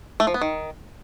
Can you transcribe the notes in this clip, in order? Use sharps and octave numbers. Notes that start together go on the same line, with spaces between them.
A3
F3
B3
D#3